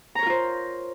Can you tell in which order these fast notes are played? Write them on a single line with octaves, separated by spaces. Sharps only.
A#5 C#5 A#4 F4 C5